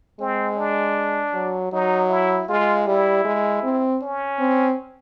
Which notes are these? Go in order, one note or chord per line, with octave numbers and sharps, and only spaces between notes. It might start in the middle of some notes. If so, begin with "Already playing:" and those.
G#3 C4
D4
F#3
F#3 D#4
E4
G#3 F4
G3 E4
G#3
C4
C#4
C4